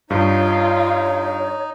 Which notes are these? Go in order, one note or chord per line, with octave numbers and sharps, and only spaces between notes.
G2 D#4 F4 C#5